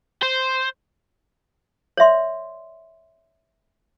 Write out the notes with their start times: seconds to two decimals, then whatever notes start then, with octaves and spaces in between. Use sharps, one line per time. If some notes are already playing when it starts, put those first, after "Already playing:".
0.22 C5
1.97 C#5 D5 E5 C6